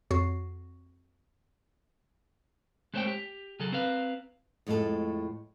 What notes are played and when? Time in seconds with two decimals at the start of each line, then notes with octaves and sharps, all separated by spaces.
0.11 F2 F#4 C#5 C7
2.94 G#3 A3 C4 C5 C#5 G5
3.07 G4
3.60 C#3 F#3 G#4 A4
3.72 C4 B4 F5
4.67 F2 A2 G#3 A3 A4